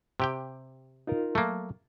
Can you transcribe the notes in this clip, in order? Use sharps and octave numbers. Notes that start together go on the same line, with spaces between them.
C3 G4 G5
D#4 F4 A#4
F#3 A3 A#3